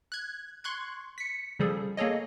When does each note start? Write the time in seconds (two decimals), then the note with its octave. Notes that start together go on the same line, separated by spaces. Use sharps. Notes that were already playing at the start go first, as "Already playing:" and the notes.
0.12 F#6 G#6
0.64 C6 C#6 F#6 G#6
1.18 B6 C#7
1.59 C#3 F3 G3 G#4 A4
1.97 A#3 G#4 A4 C#5 D#5